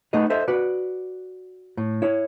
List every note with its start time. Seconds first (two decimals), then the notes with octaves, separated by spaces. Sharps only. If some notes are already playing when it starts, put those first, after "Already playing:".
0.13 A3 B3 D#4 G#4 D#5
0.30 A4 C5 D#5 E5
0.48 F#4 B4 D5
1.77 A2
2.02 E4 C#5